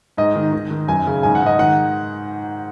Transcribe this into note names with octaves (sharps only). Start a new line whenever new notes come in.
G#2 D#5
D#3
D#3
D#3
F#2 G#5
C#3
G#2 G#5
F#5
G#2 D#5
D#3 F#5